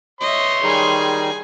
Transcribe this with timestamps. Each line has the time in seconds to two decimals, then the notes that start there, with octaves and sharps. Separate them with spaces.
0.21 C#5 D#5 E5 C6
0.63 D#3 G3 D#4 G#4 G#5